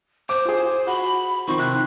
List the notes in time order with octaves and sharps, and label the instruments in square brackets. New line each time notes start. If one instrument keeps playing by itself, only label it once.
[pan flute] C5 [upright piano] D6
[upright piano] F4 G#4
[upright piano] F#4 [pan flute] B5
[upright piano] D#3 F3 C4 [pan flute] C#6
[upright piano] C3 [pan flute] F#6